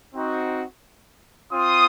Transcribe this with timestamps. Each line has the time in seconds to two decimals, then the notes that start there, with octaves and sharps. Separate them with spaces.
0.14 C4 D#4 F#4
1.52 C4 F4 C6 D#6